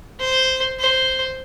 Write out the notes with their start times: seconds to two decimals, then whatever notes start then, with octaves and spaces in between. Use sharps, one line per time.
0.20 C5
0.79 C5